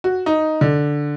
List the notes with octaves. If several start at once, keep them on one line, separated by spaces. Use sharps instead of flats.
F#4
D#4
D3